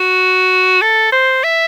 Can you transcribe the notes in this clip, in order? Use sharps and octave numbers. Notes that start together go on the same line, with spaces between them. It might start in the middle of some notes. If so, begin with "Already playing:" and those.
Already playing: F#4
A4
C5
E5